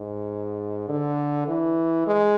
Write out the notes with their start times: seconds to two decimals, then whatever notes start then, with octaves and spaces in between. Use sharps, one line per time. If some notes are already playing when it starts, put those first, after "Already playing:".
Already playing: G#2
0.89 D3
1.48 E3
2.07 G#3